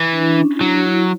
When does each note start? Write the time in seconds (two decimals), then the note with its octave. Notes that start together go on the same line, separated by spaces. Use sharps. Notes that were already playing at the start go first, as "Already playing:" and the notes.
Already playing: E3
0.13 D4
0.21 E4
0.29 D4
0.38 C#4
0.56 E4
0.60 F#3 D4
0.75 F#4
0.85 E4